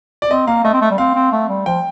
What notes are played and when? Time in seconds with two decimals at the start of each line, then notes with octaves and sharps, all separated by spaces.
0.22 D5
0.30 C4 D#5
0.47 A#3 F5
0.64 A3 D#5
0.73 C4
0.82 A3
0.90 G3
0.98 C4 F5
1.15 C4
1.32 A3
1.49 G3
1.66 F3 G5